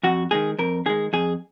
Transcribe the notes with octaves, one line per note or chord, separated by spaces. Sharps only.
F2 F#4
D#3 G#3 G#4
F2 A#4
D#3 G#3 G#4
F2 G#4